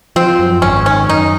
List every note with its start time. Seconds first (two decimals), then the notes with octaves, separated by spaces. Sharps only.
0.16 F3 C4
0.39 F#2
0.62 G#1 C#4
0.86 D#3 C#4
1.08 F#2 D#4